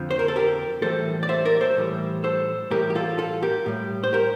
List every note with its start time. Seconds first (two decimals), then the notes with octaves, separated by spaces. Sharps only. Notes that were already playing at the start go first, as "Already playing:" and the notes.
Already playing: F2 D3 F3
0.11 C5
0.19 A#4
0.28 A4
0.36 G4 A#4
0.82 A2 E3 G3 A4 C5
1.23 D5
1.29 C5 E5
1.45 A#4 D5
1.61 A4 C5
1.77 A2 E3 G3
2.24 A4 C5
2.71 A2 E3 G3 G4 A#4
2.90 G4
2.95 F4 A4
3.18 F4 A4
3.43 G4 A#4
3.66 A2 G3
4.04 C5
4.13 G4 A#4